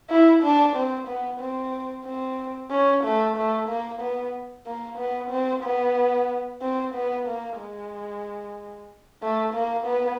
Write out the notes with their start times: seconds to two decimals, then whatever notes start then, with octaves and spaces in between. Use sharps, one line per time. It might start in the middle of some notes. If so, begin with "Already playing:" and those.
0.10 E4
0.43 D4
0.76 C4
1.08 B3
1.40 C4
2.06 C4
2.71 C#4
3.04 A3
3.37 A3
3.69 A#3
4.01 B3
4.67 A#3
4.98 B3
5.31 C4
5.63 B3
6.62 C4
6.95 B3
7.27 A#3
7.60 G#3
9.22 A3
9.54 A#3
9.87 B3